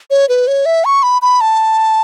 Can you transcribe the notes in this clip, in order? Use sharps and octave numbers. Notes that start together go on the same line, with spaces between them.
C#5
B4
C#5
E5
C#6
B5
B5
A5